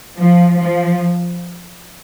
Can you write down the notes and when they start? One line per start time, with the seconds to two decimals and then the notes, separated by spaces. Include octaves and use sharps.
0.17 F3
0.59 F3